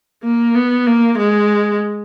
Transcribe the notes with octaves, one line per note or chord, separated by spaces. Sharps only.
A#3
B3
A#3
G#3